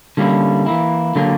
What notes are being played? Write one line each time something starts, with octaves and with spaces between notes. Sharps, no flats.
D3 G3 A#3 C#4 E4
E3 A#3 E4
D3 F#3 A#3